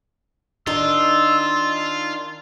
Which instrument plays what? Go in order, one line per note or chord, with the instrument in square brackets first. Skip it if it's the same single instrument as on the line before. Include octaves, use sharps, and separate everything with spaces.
[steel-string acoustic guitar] D#3 D4 D#4 [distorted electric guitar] F4 [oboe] E6